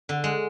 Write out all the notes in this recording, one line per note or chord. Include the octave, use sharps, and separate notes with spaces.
D3
G#3